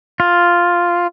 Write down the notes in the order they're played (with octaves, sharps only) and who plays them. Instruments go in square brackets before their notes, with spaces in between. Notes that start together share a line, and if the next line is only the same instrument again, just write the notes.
[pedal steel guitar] F4